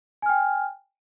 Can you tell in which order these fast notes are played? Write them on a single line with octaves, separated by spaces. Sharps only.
G#5 F6 G5